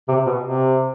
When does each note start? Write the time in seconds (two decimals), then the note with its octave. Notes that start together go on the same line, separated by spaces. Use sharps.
0.08 C3
0.26 B2
0.43 C3